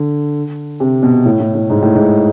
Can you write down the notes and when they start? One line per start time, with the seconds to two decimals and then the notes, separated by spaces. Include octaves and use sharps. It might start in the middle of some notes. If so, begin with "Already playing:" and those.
Already playing: D3
0.80 C3
1.03 B2
1.25 A2
1.40 A2
1.55 A2
1.70 G#2
1.82 A2
1.95 G#2